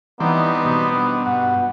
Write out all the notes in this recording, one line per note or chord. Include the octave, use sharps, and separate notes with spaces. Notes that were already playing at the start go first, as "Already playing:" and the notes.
E3 G3 B3 C4 D#4 D5
B2
D4
G2 F#5